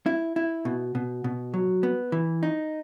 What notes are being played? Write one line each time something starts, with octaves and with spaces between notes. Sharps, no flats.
E4
E4
B2
B2
B2
F#3
B3
E3
D#4